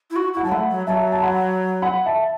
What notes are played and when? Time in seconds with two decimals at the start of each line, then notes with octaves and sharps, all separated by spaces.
0.11 E4
0.16 F#4
0.34 E4 F#5
0.43 F#3 A5
0.51 A3 F#5 B5
0.70 F#3
0.87 F#3 E5 A5
1.12 A5
1.22 F#5 B5
1.82 F#5 B5
2.06 E5 A5